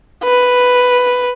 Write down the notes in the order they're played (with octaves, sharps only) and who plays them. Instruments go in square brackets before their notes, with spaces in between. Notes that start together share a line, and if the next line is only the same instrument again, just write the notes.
[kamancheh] B4